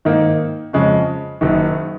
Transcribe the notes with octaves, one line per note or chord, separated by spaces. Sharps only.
G#2 D#3 A#3 D#4
F2 C#3 G#3 C#4
F#1 F#2 D#3